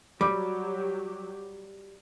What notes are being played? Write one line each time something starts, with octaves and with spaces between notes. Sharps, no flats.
F#3 G3 G4 D5 D6